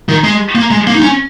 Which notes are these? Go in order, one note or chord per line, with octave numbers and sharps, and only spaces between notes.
D#3
G#3
A#3
G#3
A#3
D#4
C#4